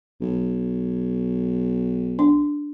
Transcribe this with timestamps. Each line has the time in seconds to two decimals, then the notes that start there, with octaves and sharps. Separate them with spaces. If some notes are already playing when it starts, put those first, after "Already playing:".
0.21 B1
2.19 D4